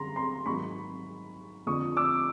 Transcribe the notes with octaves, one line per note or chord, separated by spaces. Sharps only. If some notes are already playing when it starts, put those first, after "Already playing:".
Already playing: F#2 D3 G3 A#5 C6
A#5 C6
G#2 D#3 F#3 B5 C#6
F2 D3 F3 C#6 D#6
D6 E6